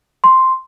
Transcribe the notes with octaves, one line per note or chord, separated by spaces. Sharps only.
C6